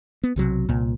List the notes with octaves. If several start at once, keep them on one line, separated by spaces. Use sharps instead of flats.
B3
B1 C3 F#3
C2 A#2